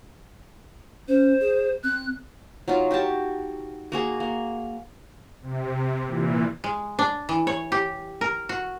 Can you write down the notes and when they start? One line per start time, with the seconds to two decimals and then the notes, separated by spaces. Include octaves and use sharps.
1.08 C#4 C5
1.40 G#4
1.84 C4 F#6
2.68 F#3 D#4 F4
2.91 F#4 G4 G5 A5
3.92 A#3 F#4 G#4
4.20 A#3
5.42 C3
6.05 A#2 E3
6.64 G#3
6.99 D4
7.29 E3
7.47 C#5
7.72 G4
8.21 A#4
8.49 F#4